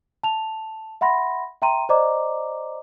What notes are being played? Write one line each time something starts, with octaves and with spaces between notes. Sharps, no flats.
A5 F7
E5 F#5 B5 C6 A#6
E5 G5 A#5 C6 D#7
C5 D5 D#5 A#5 D6